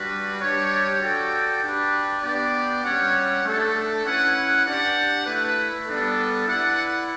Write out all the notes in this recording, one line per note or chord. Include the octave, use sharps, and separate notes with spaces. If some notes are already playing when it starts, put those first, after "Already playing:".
Already playing: G3 D4 F#4 B4
G3 D4 G4 C#5
F#4 A4 D5 G5
D4 G4 B4
B3 D4 G4 D5
G3 C#4 G4 C#5 F#5
A3 D4 A4
C#4 E4 B4 F#5
D4 G4 D5 F#5
A3 E4 B4
G3 B3 D4 A4
E4 B4 D5 F#5